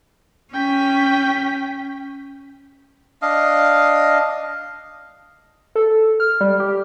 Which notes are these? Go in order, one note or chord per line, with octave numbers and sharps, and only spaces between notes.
C#4 G5 B6
D4 D#5 F5
A4
F6
G3
G4